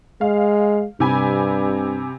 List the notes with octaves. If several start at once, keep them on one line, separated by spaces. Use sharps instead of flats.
G#3 F5
G2 C3 G#5 B5